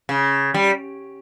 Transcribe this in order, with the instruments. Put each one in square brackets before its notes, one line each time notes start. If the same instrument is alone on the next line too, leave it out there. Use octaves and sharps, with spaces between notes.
[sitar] C#3
G3